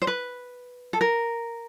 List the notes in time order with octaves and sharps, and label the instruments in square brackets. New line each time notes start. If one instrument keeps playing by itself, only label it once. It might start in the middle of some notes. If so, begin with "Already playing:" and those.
[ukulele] C5
B4
A4
A#4